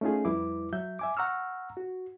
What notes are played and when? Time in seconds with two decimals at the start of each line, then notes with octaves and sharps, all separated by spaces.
0.01 A3 C#4 D#4 F4 G#4
0.25 F2 G3 E4 B4 D6
0.73 F#3 E5 G6
0.99 E5 G#5 D6
1.17 F#5 A#5 C#6 E6 F6
1.77 F#4